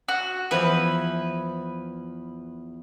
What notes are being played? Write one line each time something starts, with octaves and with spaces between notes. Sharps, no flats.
F#4
E2 F3 E4 B4